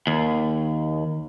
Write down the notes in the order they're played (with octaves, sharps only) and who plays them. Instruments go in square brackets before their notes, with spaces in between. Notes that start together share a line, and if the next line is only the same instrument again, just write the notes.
[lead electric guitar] D#2